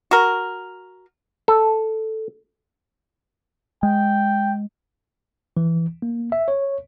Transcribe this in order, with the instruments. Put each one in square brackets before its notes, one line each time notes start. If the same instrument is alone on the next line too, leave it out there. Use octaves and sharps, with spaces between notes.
[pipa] F#4 A#4
[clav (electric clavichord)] A4
[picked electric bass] G#3 [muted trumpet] G5
[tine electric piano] E3
A#3
E5
C#5